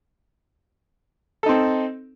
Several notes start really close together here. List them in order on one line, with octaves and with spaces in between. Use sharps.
A4 D#4 C4